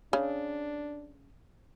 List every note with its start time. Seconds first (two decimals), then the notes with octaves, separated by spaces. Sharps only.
0.13 C#3 D4